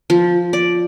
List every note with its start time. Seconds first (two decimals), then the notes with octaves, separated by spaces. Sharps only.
0.10 F3
0.53 D5